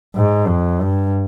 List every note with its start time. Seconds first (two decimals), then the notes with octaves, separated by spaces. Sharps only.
0.15 G#2
0.48 F2
0.81 G2